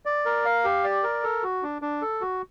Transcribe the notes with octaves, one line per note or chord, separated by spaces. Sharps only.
D5
A#4
F5
G4
D5
A#4
A4
F#4
D4
D4
A4
F#4